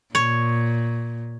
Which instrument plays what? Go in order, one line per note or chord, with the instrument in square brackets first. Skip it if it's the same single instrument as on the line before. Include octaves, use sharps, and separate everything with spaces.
[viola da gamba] A#2 [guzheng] C#5